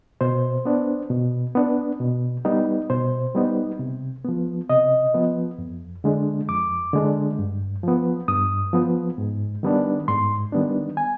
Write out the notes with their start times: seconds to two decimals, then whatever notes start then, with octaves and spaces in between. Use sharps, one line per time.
0.21 B2 C5
0.65 B3 D4
1.10 B2
1.55 B3 D4
2.00 B2
2.45 G3 B3 D#4
2.90 B2 C5
3.35 G3 B3 D#4
3.79 C3
4.24 F3 B3
4.69 C3 D#5
5.14 F3 B3
5.59 F2
6.04 D3 G#3 D4
6.49 F2 D6
6.93 D3 G#3 D4
7.39 G2
7.83 F3 B3
8.28 G2 D#6
8.73 F3 B3
9.18 G#2
9.63 D#3 G3 B3 D4
10.08 G#2 C6
10.52 D#3 G3 B3 D4
10.97 G#5